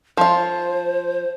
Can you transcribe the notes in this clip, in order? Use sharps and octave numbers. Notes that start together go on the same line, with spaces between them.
F3 F4 C5